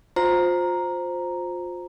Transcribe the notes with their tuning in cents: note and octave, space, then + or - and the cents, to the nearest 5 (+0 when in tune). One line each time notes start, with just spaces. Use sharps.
F4 +30 C5 +0 A#5 +0